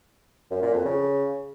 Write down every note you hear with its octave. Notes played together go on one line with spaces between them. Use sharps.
F#2
A#2
F2
C#3